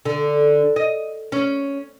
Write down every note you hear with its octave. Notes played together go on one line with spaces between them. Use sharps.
D3
D#5
C#4